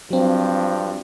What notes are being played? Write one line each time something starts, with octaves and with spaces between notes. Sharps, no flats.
G2 F3 F#3 C4